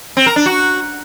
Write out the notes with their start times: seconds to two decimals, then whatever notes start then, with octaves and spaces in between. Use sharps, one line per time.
0.17 C4
0.26 A#4
0.36 D4
0.46 F#4